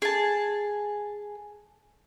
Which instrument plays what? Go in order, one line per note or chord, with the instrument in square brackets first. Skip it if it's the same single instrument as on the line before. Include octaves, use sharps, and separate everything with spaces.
[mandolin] G#4 A5